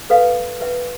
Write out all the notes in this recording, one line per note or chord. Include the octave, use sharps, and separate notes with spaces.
A4 B4 F5
B4 E5 G5